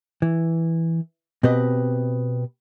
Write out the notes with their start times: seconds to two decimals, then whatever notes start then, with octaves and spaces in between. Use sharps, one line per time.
0.22 E3
1.43 B2 C4 G4 B4 D#5